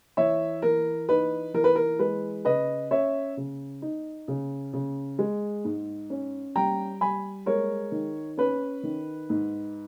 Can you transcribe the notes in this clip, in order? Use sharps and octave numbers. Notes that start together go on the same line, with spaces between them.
E3 C#5 E5
E3 A#4
D#4 B4
E3 A#4
B4
A#4
G#3 B4
C#3 B4 D#5
C#4 C#5 E5
C#3
D#4
C#3
C#3
G#3
G#2
C#4
G3 G5 A#5
G3 G#5 B5
G#3 A#4 C#5
D#3
C#4 B4
D#3
G#2